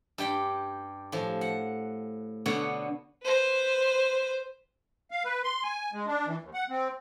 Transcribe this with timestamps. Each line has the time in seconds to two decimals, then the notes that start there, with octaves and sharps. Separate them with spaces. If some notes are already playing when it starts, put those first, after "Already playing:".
0.18 G2 G4 G5 B5
1.12 A2 F3
1.41 F#5
2.46 B2 D3 B3 C#5 F#5
3.24 B4 C5
5.11 F5
5.25 B4
5.44 C6
5.63 G#5
5.93 G#3
6.07 D4
6.26 E3
6.42 D#2
6.54 F#5
6.69 C4